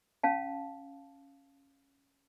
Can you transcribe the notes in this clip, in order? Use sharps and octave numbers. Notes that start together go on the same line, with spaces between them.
C#4 F5 A5